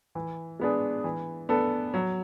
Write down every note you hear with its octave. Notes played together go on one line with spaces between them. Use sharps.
E3
G#3 B3 D4 G#4
E3
B3 D4 A4
F#3